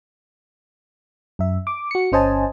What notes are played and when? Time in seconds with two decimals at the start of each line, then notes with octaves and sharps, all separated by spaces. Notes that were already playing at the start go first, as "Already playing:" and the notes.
1.39 F#2 E5
1.67 D6
1.91 F#4 C#7
2.12 G1 C#4 C5 D#5 G#5 A5